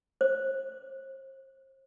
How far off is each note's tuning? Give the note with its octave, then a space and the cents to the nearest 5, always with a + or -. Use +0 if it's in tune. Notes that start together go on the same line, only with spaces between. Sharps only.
C5 +35